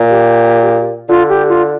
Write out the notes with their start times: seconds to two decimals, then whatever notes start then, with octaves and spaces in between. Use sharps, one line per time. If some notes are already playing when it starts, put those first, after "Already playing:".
Already playing: A#2
0.10 G4
1.09 D3 F4
1.29 G4
1.49 F4